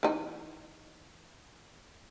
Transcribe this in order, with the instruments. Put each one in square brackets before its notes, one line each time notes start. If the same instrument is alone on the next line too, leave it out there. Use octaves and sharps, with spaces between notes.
[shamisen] E3 D#4